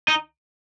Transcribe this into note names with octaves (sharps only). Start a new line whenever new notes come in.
D#4